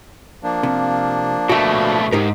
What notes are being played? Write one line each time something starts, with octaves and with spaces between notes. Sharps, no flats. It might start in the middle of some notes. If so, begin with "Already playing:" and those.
F3 A#3 D4
C3
B2 A3 F#4 E5
G#2 D#4 G4 A#4